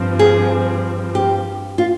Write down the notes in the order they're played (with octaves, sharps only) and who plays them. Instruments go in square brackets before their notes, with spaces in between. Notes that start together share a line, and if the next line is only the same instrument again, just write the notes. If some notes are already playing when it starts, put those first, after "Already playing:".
Already playing: [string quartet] G2 F3 C4
[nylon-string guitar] G#4
G4
F4